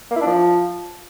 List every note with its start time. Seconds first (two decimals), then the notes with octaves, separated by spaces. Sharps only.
0.11 A#3
0.16 E4
0.21 D4
0.26 F3